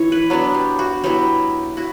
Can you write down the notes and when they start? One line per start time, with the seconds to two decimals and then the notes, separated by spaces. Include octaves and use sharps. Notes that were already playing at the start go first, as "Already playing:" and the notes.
Already playing: E3 E4 C#5
0.12 B4
0.30 F#3 B3 D4
0.54 G4
0.79 F#4
1.04 F#3 B3 E4 G4
1.77 E4 F#4